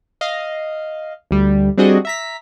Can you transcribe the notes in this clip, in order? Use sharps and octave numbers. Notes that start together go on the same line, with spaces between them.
D#5 F5
D2 G3
G3 C4 D4 F#4 G#4 D#5
E5 A#5 B6